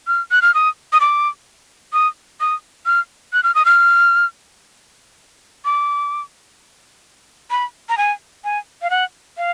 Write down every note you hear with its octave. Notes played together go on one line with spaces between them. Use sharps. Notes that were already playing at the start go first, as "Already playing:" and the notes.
F6
F#6
F6
D#6
D#6
D6
D#6
D#6
F6
F#6
F6
D#6
F6
D6
B5
A#5
G#5
G#5
F5
F#5
F5